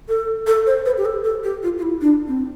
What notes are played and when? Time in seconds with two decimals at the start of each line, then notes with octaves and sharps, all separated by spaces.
0.08 A4
0.47 A4
0.67 C5
0.85 B4
0.98 G4
1.05 A4
1.24 A4
1.44 G4
1.63 F4
1.78 F4
1.82 E4
2.01 D4
2.27 C4